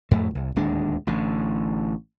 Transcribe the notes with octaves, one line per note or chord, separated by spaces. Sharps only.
F2 A2 A3
C2
D1 D#2 G#3 D4
A1 A2 D3